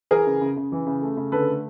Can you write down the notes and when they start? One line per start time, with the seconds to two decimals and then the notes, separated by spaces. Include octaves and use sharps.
0.11 E3 G#4 A#4
0.26 C#3
0.41 C#3
0.56 C#3
0.72 E3
0.87 C#3
1.02 A3
1.17 C#3
1.32 D3 A4 B4
1.48 A3